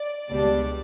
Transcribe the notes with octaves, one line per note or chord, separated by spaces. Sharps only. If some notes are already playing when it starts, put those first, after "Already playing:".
Already playing: D5
C#2 B2 G3 D4 D5